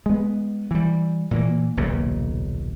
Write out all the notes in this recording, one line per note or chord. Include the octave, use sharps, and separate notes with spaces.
G#3 B3
E3 G3
A#2 E3 A#3
D#1 B1 C#3 A#3